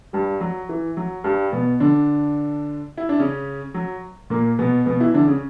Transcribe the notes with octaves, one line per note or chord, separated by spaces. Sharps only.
G2 G3
F#3
E3
F#3
G2 G3
B2 B3
D3 D4
E4
D4
C#3 C#4
F#3
A#2 A#3
B2 B3
B2 B3
E3 E4
D3 D4
C#3 C#4